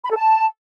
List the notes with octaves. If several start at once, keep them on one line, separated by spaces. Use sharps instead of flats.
B5
A4
A5